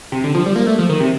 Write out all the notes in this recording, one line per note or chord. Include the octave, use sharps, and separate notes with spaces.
C3
D3
F3
G3
A#3
A3
F3
D#3
C3